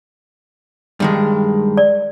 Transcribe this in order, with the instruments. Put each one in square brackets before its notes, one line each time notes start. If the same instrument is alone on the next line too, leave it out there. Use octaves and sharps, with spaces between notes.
[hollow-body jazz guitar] G2 D#3 G#3
[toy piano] D5